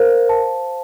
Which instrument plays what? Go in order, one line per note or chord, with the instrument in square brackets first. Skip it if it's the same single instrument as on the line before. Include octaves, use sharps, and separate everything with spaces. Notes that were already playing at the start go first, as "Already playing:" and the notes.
Already playing: [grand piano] A#4 [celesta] C5 F5
[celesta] A5